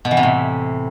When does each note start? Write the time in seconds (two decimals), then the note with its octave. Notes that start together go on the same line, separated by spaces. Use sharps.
0.05 B2
0.11 E3
0.17 C3
0.23 A2